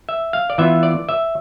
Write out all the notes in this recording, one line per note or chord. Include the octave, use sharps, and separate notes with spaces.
E5
F5
D5
E3 B3 F4 E5
D5
E5